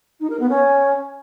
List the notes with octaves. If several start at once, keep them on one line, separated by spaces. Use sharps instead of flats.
D#4
A#4
B3
C#4